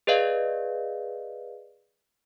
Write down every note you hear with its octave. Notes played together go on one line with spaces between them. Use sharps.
G#4 B4 D5 D#5 F5